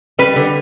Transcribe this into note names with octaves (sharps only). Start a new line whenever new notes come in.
G3 B4
D3